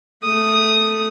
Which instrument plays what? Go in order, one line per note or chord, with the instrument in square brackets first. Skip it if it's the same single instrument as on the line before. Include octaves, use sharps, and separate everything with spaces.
[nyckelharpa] A3 D#6